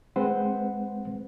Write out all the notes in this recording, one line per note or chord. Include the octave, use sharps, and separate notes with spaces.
G#3 C4 B4 C5 F#5